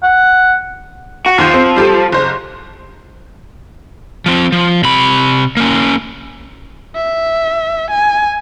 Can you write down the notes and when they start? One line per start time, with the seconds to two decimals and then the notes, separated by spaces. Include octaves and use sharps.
0.03 F#5
1.26 F#4
1.38 D#2 F3 G6
1.54 C4
1.76 G3 G4 A4
2.12 F#1 C5
4.26 F3 C4
4.52 F3
4.83 C3 B5
5.57 A#3 C#4
6.96 E5
7.91 G#5